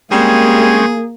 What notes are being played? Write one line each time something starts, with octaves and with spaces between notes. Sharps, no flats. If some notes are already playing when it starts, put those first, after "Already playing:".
G3 G#3 A#3 C4 C#4 G#4